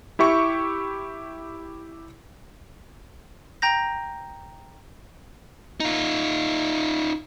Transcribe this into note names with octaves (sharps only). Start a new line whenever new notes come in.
E4 G4 E5 C#6
G5 A#5 G6 A#6
D#4 F4